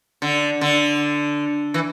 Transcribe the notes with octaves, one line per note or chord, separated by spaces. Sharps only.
D3
D3
E3